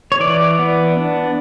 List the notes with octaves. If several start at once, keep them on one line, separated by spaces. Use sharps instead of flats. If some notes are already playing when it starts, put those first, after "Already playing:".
C#5
E3 D5
B3
D4